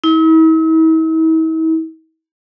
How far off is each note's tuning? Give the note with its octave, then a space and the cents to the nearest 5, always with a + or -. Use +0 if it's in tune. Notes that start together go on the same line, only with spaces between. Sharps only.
E4 -45